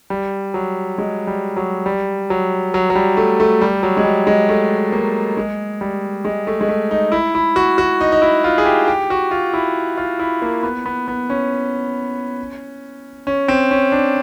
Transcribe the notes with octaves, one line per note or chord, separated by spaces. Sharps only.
G3
F#3
G#3
G3
F#3
G3
F#3
F#3
F#3
G3
A3
A3
G3
F#3
G#3
G3
G#3
A3
A#3
G#3
G3
G#3
A3
G#3
A3
D#4
E4
E4
F#4
F#4
D#4
D#4
E4
F4
G#4
G4
G4
F#4
F4
E4
F4
E4
A#3
B3
B3
B3
C#4
C#4
C4
C#4
D4